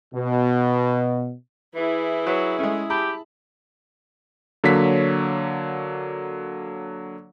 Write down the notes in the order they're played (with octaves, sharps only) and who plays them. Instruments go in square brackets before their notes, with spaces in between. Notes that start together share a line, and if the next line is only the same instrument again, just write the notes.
[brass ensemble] B2
[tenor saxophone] E3 [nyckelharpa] E4 G#4
[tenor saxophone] F#3 [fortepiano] B4
[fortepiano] G#3 C#4 [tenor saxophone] A3
[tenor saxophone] G4 [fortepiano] A5 B5
[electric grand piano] D3 F#3 A#3 C#5 B6